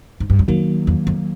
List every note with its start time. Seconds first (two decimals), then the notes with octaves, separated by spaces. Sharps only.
0.20 G#2
0.30 G2
0.39 F#2
0.48 F2 D#3 F#3 A#3
0.87 E2
1.07 F2